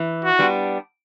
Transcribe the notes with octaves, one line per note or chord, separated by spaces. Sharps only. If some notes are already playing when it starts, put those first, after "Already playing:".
Already playing: E3
F#4
G3 B3 D4